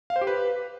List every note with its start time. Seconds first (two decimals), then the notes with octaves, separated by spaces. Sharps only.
0.10 F5
0.16 C5
0.21 G4
0.27 B4